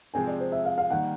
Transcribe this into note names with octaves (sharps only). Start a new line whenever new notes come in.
C3 F3 G#3 C4 G#5
D5
C5
E5
F5
F5
D#3 G3 A#3 F#5